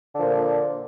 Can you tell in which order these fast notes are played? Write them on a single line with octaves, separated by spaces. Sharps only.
D3 F3 A#2